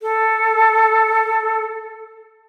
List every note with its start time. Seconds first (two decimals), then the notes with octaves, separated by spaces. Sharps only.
0.02 A4